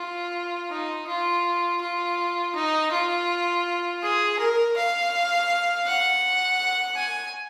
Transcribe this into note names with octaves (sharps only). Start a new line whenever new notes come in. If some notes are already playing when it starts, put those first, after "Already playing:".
Already playing: F4
D#4
F4
F4
D#4
F4
G#4
A#4
F5
F#5
G#5